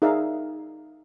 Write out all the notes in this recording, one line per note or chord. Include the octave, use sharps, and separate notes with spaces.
D#4 G#4 A#4 D5 E5 F5